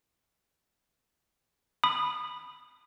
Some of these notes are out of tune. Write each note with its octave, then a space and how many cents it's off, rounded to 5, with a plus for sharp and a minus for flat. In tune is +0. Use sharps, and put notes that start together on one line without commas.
B5 +0 D#6 -25